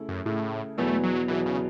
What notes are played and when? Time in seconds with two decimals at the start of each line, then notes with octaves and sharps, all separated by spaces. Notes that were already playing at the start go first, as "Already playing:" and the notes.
Already playing: C#3 A3 E4
0.09 F#2
0.26 A2 C#3 A3 E4
0.78 E2 B2 F#3 A3 B3
1.03 F#3
1.28 E2 B2 E3 F#3 B3
1.46 C#3